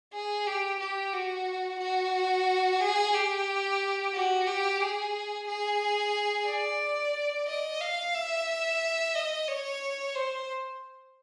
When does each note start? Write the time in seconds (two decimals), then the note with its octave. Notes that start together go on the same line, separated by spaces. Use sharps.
0.13 G#4
0.47 G4
0.80 G4
1.13 F#4
1.80 F#4
2.80 G#4
3.14 G4
4.14 F#4
4.47 G4
4.80 G#4
5.47 G#4
6.47 D5
7.48 D#5
7.81 F5
8.15 E5
9.15 D#5
9.48 C#5
10.15 C5